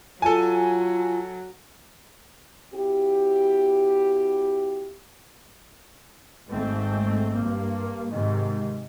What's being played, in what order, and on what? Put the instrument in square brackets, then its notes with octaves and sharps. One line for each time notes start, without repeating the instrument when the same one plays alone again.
[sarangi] F#3 [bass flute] F4 [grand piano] A4 G#5
[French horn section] C4 E4 F#4 G4
[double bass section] G#1 G#2 A3 C4
G2 A#3
G#2 C3 D#3